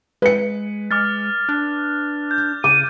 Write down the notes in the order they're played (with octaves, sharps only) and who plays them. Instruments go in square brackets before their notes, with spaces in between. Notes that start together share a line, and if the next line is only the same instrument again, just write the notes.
[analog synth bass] G#3 [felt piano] B4 C#7
[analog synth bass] G#3 [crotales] D6 F6 A6
[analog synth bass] D4 [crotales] F#6
[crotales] G6
[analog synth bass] C#3 [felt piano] D6 [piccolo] D#7